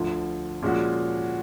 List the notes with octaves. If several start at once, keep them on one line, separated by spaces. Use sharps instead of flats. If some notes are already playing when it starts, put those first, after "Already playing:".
Already playing: D2 D3 F3
A#2 F3 G#3 C#4 F#4